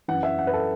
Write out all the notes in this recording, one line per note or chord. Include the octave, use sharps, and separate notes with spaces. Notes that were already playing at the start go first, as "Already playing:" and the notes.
F#2 E3 F#5
E5
F#5
B4
A4